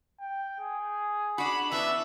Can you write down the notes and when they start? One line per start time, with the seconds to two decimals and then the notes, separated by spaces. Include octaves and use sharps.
0.20 G5
0.61 G#4
1.38 D4 F#4 B5
1.72 E3 B3 D4 E5